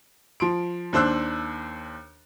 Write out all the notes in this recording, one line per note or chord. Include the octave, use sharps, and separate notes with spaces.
F3 C6 D7
D#2 D4 C5 E6 F#6